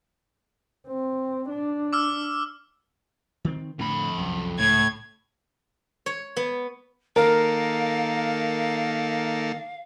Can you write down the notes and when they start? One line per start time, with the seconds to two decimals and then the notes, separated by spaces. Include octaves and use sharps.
0.87 C4
1.49 D4
1.93 D6 E6 F6
3.45 D#3 C4
3.79 F2 A2 D3 B5
4.18 C2 F#2
4.59 C#2 A2 G#6
6.06 C#5
6.37 B3
7.16 D#3 A#3 A4 A#4 F5